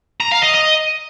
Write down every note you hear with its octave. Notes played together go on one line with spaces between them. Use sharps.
A#5
F5
D#5
D#5